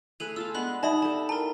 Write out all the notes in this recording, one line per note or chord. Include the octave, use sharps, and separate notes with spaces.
A3 G#4 A4 B4 D#7 F7
F4 A4 F5 E6
G#3 B3 D4 B5 F#6
G3 D#4 D5 E5 A5 B5 D#6
G4 A4 A5
E4 A#4 A5 A#5